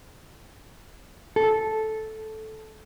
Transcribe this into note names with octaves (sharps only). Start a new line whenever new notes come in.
A4